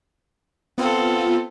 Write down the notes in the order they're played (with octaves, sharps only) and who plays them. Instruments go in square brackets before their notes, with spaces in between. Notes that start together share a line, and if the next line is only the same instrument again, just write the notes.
[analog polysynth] B3 F4 [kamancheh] C4 A4